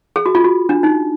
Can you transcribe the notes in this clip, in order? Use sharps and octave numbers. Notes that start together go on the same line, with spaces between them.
G#4
F#4
F4
F#4
D4
D#4